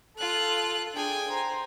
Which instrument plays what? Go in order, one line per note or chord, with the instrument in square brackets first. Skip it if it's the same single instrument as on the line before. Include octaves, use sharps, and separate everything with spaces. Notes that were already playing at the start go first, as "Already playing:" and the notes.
[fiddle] F4 F#6 [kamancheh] A4
[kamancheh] D4 G#4 [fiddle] G5 G#5
[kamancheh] C5 A#5